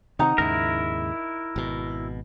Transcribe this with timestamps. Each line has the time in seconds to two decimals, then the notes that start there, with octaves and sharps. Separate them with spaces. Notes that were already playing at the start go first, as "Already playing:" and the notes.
0.19 C3 D#3 C4 D#4 F#5 A#5
0.38 D#2 G#2 C#3 E4 A#4
1.56 G#1 B2